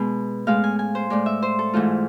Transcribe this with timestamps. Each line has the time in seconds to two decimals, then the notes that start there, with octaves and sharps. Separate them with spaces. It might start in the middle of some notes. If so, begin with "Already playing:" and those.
Already playing: B2 G#3
0.47 A2 G#3 F5
0.64 G#5
0.79 G#5
0.95 C5
1.10 A2 G#3 D5
1.26 E5
1.42 C5
1.59 A4
1.73 G#2 E3 A3 F4